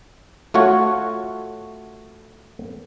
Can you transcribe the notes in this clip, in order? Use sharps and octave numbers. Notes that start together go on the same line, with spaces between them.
A3 F4 F#4 C#5 F#5